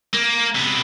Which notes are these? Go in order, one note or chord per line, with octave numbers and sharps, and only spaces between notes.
A#3
C3 B3